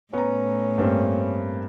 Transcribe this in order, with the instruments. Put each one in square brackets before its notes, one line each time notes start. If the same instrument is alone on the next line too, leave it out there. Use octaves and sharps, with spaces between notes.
[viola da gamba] A2 [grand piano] B3 A#5 [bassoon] C#4
[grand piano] G2 A#3 C4